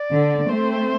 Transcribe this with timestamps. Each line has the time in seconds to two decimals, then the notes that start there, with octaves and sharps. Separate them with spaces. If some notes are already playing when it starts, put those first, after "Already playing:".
Already playing: D5
0.12 D3
0.49 A3 C4 C5